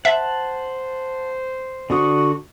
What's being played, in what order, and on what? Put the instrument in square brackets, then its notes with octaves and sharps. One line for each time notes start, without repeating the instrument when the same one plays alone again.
[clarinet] C5 [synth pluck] E5 [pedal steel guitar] F#5 A5
[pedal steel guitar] D3 D4 D#6 [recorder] F#4